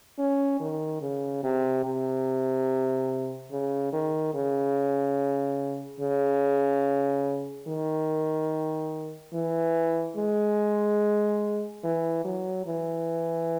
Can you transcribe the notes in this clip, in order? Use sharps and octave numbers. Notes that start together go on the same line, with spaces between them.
C#4
D#3
C#3
C3
C3
C#3
D#3
C#3
C#3
D#3
E3
G#3
E3
F#3
E3